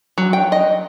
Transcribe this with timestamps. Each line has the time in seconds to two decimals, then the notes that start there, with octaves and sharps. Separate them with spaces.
0.18 F#3
0.33 G5
0.52 D#5